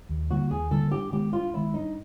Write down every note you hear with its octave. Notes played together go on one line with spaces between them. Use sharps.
D#2
D3 G3 A#3 F#4
D#2 G#4
D3 G3 A#3 A4
G2 G4
D#3 G#3 B3 G4
G2 F4
D#3 G#3 B3 E4
G2 D#4